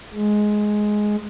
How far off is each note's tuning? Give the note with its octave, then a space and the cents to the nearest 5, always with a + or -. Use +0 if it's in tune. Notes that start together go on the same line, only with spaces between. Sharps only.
G#3 +10